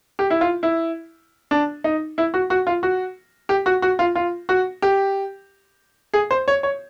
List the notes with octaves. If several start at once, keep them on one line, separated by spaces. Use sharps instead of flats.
G4
E4
F4
E4
D4
D#4
E4
F#4
F#4
F4
F#4
G4
F#4
F#4
F4
F4
F#4
G4
G#4
C5
C#5
C#5